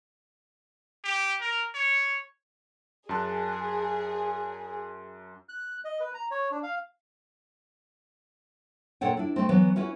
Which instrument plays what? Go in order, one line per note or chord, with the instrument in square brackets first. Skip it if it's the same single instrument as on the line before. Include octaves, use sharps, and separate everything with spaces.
[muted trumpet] G4
A#4
C#5
[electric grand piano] F#2 A5 F#6 [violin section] G#4
[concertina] F#6
D#5
B4
A#5
C#5
D4
F5
[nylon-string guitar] A#2 A4 C#5 F#5 G5
D4 E4
A3 C4
E3 F#3 B3
C#4 E4 F#4 B4